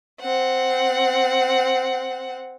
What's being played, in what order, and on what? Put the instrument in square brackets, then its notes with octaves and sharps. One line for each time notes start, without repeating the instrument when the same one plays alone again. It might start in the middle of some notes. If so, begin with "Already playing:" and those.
[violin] C4 F#5